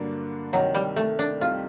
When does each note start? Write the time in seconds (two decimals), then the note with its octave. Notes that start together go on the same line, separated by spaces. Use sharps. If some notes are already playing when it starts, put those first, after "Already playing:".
Already playing: G2 D3 F#3 A#3 D4
0.53 C2 C3 D#3 F#3
0.74 G3
0.96 A3
1.19 D4
1.41 C2 C3 D#3 G3 F4